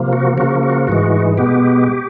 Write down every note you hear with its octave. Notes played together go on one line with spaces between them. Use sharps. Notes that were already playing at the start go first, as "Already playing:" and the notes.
Already playing: C3 F3 A#3
F#4
C#3 F3 A#3 F#4
F#4
G#2 E3 G#3 F#4
B2 G#3 B3 G4